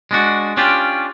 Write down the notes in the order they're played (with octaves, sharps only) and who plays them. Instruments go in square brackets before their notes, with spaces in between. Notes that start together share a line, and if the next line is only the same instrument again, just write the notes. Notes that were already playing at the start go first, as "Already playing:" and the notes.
[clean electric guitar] G#3 D4 F#4
C#4 D4 F4 G4